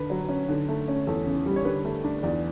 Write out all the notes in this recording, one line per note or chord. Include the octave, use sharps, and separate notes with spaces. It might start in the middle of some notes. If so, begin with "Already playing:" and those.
Already playing: D3 B4
F#3
C#4
D3
A3
C#4
E2 A4
C#3
G3
C#5
D3 B4
A3
D4
E2 D5